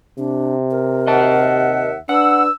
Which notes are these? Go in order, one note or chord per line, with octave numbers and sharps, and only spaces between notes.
C3 D4
A#4
D#2 D#5 E5 F#5 A5
D4 B4 F#5 E6